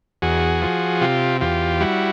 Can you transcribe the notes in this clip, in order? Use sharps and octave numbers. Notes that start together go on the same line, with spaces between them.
E2 F#4 G#4
F3
C3 F4 G4
E2 F4 G4
G3 E4 F#4